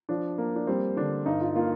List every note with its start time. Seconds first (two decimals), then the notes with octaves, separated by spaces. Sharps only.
0.09 F3 D4
0.38 A#3
0.56 D4
0.67 G3 C4
0.97 D3 D4
1.26 G2 D#4
1.41 F4
1.56 A#3 F4